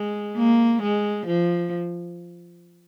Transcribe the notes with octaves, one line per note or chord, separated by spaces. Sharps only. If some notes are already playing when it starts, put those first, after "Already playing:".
Already playing: G#3
A#3
G#3
F3